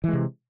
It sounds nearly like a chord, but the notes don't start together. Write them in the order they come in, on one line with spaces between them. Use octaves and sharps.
E3 G#3 C3